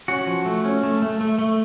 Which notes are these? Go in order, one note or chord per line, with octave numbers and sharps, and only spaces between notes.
C#4 F#4
F3
A3
C#4
A3
A3
A3
A3